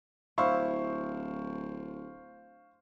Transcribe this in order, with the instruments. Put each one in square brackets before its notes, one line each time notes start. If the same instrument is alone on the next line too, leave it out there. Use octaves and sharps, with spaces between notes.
[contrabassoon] D1 [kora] E4 [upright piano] C5 F5 C#6